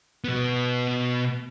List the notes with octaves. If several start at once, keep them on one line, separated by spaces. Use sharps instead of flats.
B2 B3